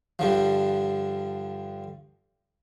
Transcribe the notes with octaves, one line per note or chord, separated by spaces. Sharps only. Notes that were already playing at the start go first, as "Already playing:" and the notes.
G2 D3 F3